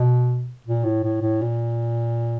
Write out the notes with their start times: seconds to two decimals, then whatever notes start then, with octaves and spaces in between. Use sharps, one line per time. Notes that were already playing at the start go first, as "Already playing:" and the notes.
Already playing: B2
0.66 A#2
0.84 A2
1.03 A2
1.21 A2
1.41 A#2